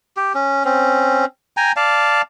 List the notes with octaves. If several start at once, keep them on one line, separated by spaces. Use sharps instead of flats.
G4
C#4
C4 C#4
G5 G#5 A#5
D5 F5 A5